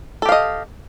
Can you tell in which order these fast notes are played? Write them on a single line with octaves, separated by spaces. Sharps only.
A4 G4 F5 D#5